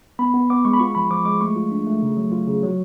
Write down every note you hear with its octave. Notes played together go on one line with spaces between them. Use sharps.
B3 B5
B3
B3 D6
G#3 C#6
B5
F4 C#6
F3 B5
F3 D6
G#3 D6
A3 C#6
F4
D4
A3
C#3
F#3
F4
C#3
F#3